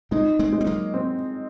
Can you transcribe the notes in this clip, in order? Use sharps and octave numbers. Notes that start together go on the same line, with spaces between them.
G#3 C4 D#4
G#3 C4
G#3
C4
F#3 A#3
C4